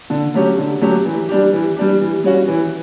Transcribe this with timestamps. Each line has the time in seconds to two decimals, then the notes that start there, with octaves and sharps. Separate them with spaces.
0.10 D3
0.34 F#3 A3 C#4 G4
0.58 D3
0.81 F#3 A3 C#4 G4
1.05 E3
1.29 G3 D4 G4
1.52 E3
1.76 G3 D4 G4
2.01 E3
2.24 G3 C#4 F#4
2.48 E3